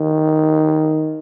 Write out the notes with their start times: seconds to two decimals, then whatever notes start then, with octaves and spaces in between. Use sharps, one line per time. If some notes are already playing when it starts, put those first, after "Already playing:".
Already playing: D#3